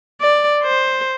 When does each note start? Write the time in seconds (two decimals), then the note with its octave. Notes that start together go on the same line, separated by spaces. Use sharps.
0.21 D5
0.63 C5